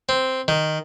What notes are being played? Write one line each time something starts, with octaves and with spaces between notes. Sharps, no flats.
C4
D#3